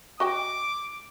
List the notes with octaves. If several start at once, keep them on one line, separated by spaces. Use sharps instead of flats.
F#4 D#5 G5 D6